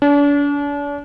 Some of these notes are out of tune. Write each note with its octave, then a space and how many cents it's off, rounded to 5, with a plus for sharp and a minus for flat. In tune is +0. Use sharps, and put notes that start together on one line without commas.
D4 -40